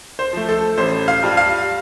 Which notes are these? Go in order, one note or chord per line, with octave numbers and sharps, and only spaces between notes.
C5
F3 A3
A4
A1 C5
F5
G2 G3 F4
F5